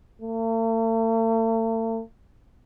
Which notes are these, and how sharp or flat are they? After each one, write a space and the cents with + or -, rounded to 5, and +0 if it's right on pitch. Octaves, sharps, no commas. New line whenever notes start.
A3 +45